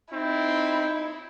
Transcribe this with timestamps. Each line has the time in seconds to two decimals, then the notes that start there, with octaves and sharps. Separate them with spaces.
0.13 C4 D#4 E4